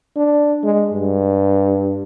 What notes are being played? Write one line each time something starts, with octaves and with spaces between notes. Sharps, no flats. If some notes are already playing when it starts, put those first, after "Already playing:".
D4
G#3
G2